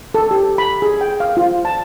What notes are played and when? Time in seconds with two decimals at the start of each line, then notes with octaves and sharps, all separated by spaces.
0.14 A4
0.31 G4
0.58 B5
0.82 G#4
1.01 G5
1.20 F5
1.37 F4
1.65 A5